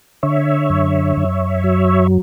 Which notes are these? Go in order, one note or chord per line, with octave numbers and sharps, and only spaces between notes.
D3 C#5 E5
F#2
F#2
F#3